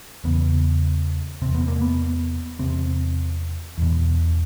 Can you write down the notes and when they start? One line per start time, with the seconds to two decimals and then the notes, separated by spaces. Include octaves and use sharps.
0.24 E2 C#3 B3
1.42 E2 C3 C4
1.55 B3
1.68 A#3
1.81 B3
2.59 E2 C3 C4
3.78 E2 B2